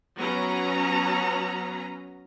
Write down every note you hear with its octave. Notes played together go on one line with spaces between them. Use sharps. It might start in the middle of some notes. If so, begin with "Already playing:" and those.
F#3 B3 C#4 A#5